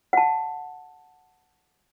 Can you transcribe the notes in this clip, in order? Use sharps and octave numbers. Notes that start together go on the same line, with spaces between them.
F#5 A5